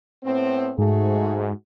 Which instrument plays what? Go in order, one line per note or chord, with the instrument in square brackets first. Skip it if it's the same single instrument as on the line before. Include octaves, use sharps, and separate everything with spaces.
[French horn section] A2 B3 C4
[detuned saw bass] G#2 [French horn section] A3 F#4 G#4